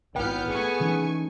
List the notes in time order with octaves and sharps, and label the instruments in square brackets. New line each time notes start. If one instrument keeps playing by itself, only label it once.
[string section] G#1 F6 G6 [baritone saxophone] B3 [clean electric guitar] E4 G5
[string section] A3 G#5 C#6 [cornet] G#4
[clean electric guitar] E3 C#4 D#4